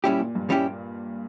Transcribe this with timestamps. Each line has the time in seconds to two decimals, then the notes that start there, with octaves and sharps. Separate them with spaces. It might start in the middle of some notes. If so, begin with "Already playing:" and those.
0.04 A#2 G3 C#4 E4 G4
0.19 A#2
0.35 G2
0.50 G3 C#4 E4 G4